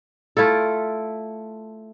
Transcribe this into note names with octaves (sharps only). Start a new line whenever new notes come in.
A3 E4 F4 A4